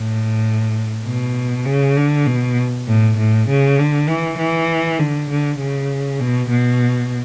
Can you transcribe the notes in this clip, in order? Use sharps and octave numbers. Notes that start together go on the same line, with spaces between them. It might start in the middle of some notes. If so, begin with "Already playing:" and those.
Already playing: A2
B2
C#3
D3
B2
A2
A2
C#3
D3
E3
E3
D3
D3
C#3
B2
B2